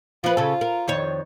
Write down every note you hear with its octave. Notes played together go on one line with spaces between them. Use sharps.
F3 F4 B4
C#3 A4
A#4
F2 D#3 C#5